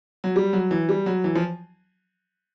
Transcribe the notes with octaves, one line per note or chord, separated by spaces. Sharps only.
F#3
G3
F#3
E3
G3
F#3
E3
F3